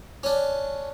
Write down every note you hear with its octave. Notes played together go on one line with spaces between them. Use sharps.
C#4 D4